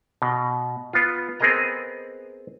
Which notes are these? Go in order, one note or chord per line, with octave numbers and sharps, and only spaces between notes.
B2
B3 F4
B3 C4 G#4 A#4 D#5 A#5